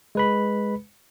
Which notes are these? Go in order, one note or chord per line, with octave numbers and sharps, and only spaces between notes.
G#3 B4 B5